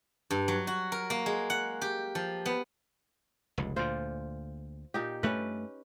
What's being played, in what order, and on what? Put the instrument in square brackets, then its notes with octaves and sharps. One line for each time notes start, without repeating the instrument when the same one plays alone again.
[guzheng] G2
F#3
F#4
A#4
A#3
G#3
F#5
G4
F3
B3
[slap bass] F1 C#2
[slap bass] D2 A#2 D3 [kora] F4 C5
[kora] A#2 D#4 G4
[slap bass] G2 A3 [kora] C#4 B4